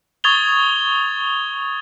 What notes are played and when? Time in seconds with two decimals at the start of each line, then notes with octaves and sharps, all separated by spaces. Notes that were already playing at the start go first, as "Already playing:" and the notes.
0.24 C#6 D#6 G#6 A6 F7 G7